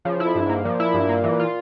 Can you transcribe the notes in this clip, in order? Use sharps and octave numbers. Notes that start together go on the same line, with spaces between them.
C#3 F3
F2 E4
G2
G#2 A#3
A#2 F3
E4
G2
A#3
E3
F4